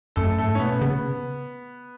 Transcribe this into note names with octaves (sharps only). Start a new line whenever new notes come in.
F#2 A3 A4
G#2 A3 A4
C#4
B2 B3
C#3 B3